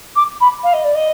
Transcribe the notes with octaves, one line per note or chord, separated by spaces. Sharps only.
D6
B5
F5
D#5
D5
D#5